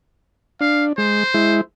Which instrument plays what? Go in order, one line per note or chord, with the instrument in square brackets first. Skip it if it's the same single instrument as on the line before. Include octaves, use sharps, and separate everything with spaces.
[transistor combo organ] D4 [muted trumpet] F5
[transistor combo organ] G#3 [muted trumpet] C5
[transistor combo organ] G#3 E4